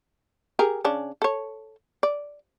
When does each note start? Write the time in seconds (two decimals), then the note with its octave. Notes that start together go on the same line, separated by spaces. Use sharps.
0.59 G4 G#4 A#4
0.84 C#3 C#4 D4
1.22 A4 C#5
2.03 D5